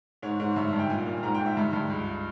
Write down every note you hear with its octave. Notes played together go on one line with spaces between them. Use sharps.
G#2 C#5
G#2
G2 E5
E5
G2
G5
A#2 G#5
A#2
G#2 A#5
G5
G#2
E5
G2
G2
C#2